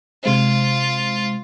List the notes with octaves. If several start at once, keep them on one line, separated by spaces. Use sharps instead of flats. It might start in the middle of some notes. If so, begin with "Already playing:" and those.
C3 G#3 F4 C5